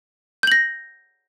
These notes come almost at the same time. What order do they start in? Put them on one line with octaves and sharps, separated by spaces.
G6 F#7 A#6